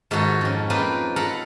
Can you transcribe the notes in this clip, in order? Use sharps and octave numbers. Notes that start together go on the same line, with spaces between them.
G#2 D#3 F4 F#4 A4
F2 C#4
A#3 C4 D#4 F4 B4
A4 A#4 F5 F#5 A#5 B5